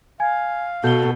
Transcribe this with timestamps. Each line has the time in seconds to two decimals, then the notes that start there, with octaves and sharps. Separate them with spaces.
0.20 F5 G#5 G#6
0.84 B2 F#4 A4 G6 G7